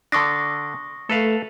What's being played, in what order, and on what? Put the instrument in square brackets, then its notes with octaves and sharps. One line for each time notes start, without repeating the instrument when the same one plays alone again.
[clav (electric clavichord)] D3 D4 [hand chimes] C#6 D#6 A#6
[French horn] A3 [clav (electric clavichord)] A4 B4 F5